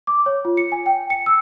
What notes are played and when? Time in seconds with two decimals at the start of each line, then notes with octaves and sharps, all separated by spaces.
0.07 D6
0.26 C#5
0.45 F4
0.57 C#7
0.72 G#5
0.86 G5
1.10 C#7
1.26 E6